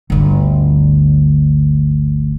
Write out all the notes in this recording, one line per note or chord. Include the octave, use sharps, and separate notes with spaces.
G1 D2